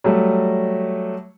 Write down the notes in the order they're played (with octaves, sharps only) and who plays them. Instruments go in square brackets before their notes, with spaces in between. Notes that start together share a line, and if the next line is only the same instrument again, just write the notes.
[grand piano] F#3 G3 A3